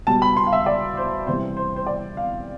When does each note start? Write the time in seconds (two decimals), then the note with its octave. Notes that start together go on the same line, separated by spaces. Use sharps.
0.07 B2 G3 A5
0.22 B5
0.37 C6
0.47 F5
0.53 E5
0.66 D5
0.97 C5
1.27 C3 E3 G3 C5
1.57 C5
1.76 C5
1.87 D5
2.17 F5